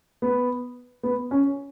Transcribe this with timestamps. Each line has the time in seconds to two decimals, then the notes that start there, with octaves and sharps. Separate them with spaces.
0.22 B3
1.03 B3
1.31 C#4